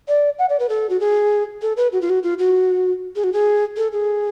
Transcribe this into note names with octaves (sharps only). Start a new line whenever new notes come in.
D5
F#5
D5
B4
A4
F#4
G#4
A4
B4
F#4
F4
F#4
F4
F#4
G#4
F#4
G#4
A4
G#4